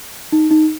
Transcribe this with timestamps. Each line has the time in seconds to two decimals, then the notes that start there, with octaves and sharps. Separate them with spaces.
0.32 D#4
0.51 D#4